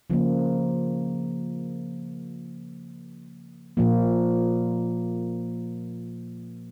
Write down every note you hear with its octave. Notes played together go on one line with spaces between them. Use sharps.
C#3 F3 A#3
A#2 F3 A#3